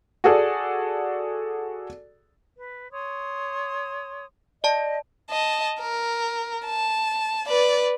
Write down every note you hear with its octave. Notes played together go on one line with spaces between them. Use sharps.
F#4 G#4 A4 D5
B4
C#5 C6 D#6
D5 D#5 A5
D#5 A5
A#4
A5
B4 D5